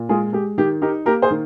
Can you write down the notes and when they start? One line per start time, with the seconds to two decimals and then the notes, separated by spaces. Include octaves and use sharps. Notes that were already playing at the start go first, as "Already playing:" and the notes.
Already playing: A#2
0.09 G#3 F4 G#4
0.33 G#3 G4
0.58 D#3 G4
0.82 D#4 G4 A#4
1.06 A#3 G4 A#4
1.22 G#4 C5
1.31 D#3